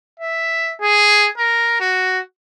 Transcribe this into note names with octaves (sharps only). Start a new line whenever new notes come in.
E5
G#4
A#4
F#4